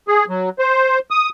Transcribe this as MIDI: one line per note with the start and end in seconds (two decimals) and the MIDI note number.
0.08 0.25 68
0.29 0.49 54
0.59 0.99 72
1.11 1.29 87